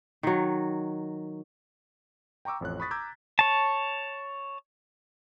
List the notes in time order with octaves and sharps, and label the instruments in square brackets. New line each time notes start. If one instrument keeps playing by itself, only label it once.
[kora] D#3 F#3
[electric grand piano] G5 A#5 C#6 D6 E6
A1 F2 C#5 F#6
B5 C#6 D#6 A6 B6
A#5 D6 E6 G6 G#6
[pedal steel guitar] C#5 A5